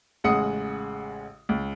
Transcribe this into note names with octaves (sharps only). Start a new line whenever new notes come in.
A1 C#3 G#3 F#5 D#6 C#7
C#2